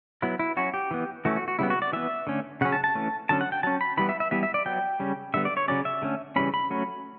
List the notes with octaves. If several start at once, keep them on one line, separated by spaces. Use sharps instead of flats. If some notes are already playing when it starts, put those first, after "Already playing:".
F#3 B3 E4
E4
F#3 C#4 F#4
G4
E3 B3
E3 A3 C#4 F#4
F#4
F#4
C#3 G3 B3 E4
F#4
D5
E3 B3 E5
D3 A3 C#4
C#3 F#3 C#4 F#5
A5
A5
E3 A3 C#4
D3 F#3 C#4 A5
F#5
G5
F#3 C#4 A5
B5
E3 G3 B3 B5
E5
E5
E3 G3 B3 E5
E5
D5
F#3 B3 G5
C#3 G3 C#4
D3 G3 B3 E5
D5
C#5
C#3 F#3 C#4 D5
E5
D3 A3 C#4
C#3 E3 G3 C#4 B5
B5
F#3 A3 C#4